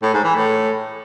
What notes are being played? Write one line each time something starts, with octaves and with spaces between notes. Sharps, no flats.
A2
G#2
E3
A2